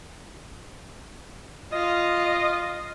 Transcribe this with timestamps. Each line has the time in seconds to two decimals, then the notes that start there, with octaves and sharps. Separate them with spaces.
1.72 F4 D#5